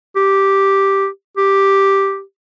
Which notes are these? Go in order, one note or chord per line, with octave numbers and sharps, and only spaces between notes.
G4
G4